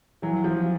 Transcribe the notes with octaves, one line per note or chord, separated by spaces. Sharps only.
E3 F#3
F3